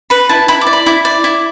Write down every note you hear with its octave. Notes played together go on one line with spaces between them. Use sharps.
B4 B5
E4 A5
E4 B5
D6
D5
B5
E4
D5
E4